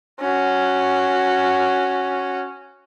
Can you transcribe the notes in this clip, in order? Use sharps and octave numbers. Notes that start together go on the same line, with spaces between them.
C#4 F#4